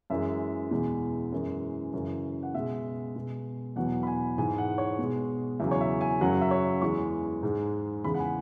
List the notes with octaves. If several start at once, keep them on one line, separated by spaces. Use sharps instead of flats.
F#2 E3 G#3 E5
E2 B2 G#3
F#2 E3 G#3
F#2 C#3 E3
F#5
B2 G#3 E5
B2 G#3
E2 B2 F#3 F#5
B5
G#5
G#2 E3 G#3 G#5
F#5
C#5
B2 G#3
E2 C#3 F#3 E5
C#5
E5
G#5
F#2 C#3 F#3 F#5
E5
C#5
E2 E3 G#3 C#6
G#2 G#3
E2 C#3 E3 G#3 B5
F#5
G#5